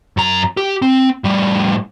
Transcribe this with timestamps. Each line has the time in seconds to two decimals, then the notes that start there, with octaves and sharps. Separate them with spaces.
0.17 F#2 A#5
0.57 G4
0.82 C4
1.24 A2 G3